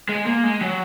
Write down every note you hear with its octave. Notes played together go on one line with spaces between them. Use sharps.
G#3
A#3
G#3
F#3